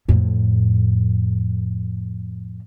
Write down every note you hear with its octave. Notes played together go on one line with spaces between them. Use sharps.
F2 A2